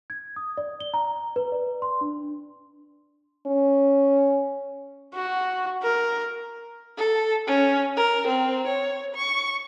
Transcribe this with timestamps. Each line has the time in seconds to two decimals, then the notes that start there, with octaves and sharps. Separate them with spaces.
0.10 G#6
0.36 D#6
0.57 D5
0.80 G7
0.94 A#5
1.36 B4
1.52 D5
1.82 C6
2.01 D4
3.47 C#4
5.14 F#4
5.83 A#4
6.98 A4
7.47 C#4
7.97 A#4
8.27 C4
8.67 C#5
9.15 C#6